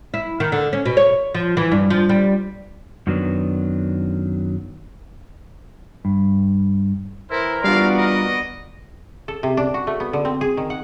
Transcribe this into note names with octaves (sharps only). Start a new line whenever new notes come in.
E4
D#3
D3
C#4
B2
C#5
F3
E3
G2
F3
G3
F#2 D#3 F#3 B3 D4
G2
E3 E4 A#4 C5
G3 B3 D4 F4 F#4 D5 F5
D#5
A4
C3
D4
F#4
A3
B3
D3
C4
G#4
D#3
F#5